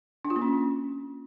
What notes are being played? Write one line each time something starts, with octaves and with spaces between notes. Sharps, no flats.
D4
F4
A#3
C#4